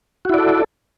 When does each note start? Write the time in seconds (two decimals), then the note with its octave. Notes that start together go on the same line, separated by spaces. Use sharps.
0.25 F#4
0.29 E4
0.34 D5
0.38 A4